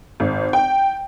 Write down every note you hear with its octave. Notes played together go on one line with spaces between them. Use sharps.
G#1
G5